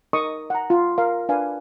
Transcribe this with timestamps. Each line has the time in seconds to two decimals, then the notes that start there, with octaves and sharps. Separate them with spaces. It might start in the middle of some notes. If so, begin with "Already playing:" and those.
0.13 D#4 A#4 D#5 C#6 D#6
0.50 F#5 A#5
0.70 F4
0.98 A#4 F5
1.29 D4 B4 D5 F5 G#5